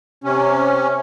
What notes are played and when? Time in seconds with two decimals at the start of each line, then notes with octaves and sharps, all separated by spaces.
0.24 C3 C#4